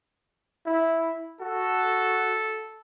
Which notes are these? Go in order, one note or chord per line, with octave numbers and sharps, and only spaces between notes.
E4
F#4 A4